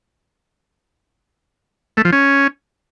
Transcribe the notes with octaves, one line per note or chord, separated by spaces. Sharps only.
A3
F3
C#4